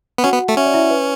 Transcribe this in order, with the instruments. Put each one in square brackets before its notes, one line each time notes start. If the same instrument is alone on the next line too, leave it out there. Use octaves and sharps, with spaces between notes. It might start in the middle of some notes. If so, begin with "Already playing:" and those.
[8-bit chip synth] B3
[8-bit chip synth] C#4 [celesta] F#4 F#5
[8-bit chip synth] B3
A3
[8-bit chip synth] C#4 [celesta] E5
[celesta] D5
E4 E5
B4